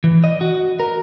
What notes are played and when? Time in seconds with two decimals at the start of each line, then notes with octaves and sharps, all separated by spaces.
0.04 E3
0.24 D#5
0.41 F#4
0.80 A#4